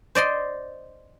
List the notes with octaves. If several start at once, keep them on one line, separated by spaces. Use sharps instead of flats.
C5 D5 D#5 C6